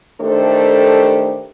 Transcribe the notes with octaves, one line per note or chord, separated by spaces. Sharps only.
D#3 A3 D4 G4 A4 C5